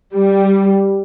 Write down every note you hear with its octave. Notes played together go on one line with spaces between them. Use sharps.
G3